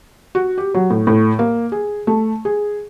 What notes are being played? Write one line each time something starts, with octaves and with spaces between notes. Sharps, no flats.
F#4
G4
F#3
A2
A2
A#3
G#4
A3
G#4